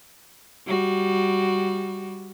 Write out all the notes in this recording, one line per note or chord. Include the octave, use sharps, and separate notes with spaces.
G3 F#4